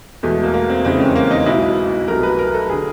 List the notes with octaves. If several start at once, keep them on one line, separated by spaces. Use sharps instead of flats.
E2 B2 G#3 A3
A#3
A#3
C4
F1 E2 C#3 E3 G#3 C4
C#4
A#3
D#4
B1 B2 G#3 E4
C2 B2 F#3 A3 A#4
B4
A#4
A4
D3 G#4